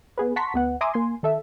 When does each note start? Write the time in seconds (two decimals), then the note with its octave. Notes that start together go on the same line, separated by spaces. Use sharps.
0.18 B3 G#4 B4
0.36 F#5 A5 A#5 C6 C#6 B6
0.54 D2 B3 F#5
0.81 E5 G#5 A#5 C6 D6 D#6
0.94 A#3 G#5 C6
1.23 D#3 A4 E5